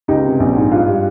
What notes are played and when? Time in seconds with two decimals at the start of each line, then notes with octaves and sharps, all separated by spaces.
0.08 C#2 D#4 G4
0.25 C3
0.40 A#1
0.56 G#2
0.71 G2 F4
0.88 G3